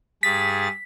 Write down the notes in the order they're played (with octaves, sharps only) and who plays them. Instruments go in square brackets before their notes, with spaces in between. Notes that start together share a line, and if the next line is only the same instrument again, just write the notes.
[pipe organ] G2 G#4 A6 [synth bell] B6